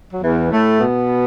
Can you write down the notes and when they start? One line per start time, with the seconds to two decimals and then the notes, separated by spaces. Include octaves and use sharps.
0.11 F#3
0.21 E2 E3
0.50 A2 A3
0.79 B2 B3